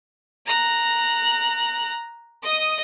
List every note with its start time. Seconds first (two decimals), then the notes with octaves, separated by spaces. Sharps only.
0.46 A#5 F#6
2.43 D#5 D#6